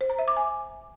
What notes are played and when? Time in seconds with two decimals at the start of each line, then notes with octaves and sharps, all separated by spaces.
0.01 C5
0.10 A#5
0.19 E5
0.28 D6
0.37 G#5